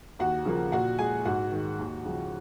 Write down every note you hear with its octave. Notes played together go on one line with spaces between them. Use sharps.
D#2 F#4 F#5
C#3 F3 A#3
A#2 F#4 F#5
G#3 G#4 G#5
G#2 F#4 F#5
D#3 G#3
D#2
C#3 F3